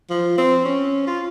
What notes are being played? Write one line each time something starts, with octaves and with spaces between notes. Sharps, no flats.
F3
C4
C#4
F4